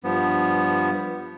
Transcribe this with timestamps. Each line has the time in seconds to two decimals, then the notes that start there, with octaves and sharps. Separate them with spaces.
0.04 G2 F3 B3